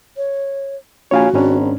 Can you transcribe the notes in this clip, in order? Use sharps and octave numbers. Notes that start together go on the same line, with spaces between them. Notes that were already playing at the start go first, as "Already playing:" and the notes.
C#5
A#1 F#4 C#5 F5 G#5
G#1 G#2 C#4 D4